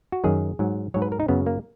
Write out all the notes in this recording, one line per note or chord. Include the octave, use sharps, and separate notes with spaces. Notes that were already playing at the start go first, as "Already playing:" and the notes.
F#4
F#2 D#3 F#3 G#4
G#2 F#3
G#2 F#3 C#5
B4
A#4
D#4
F#2 C#3 F#3 B3
A#3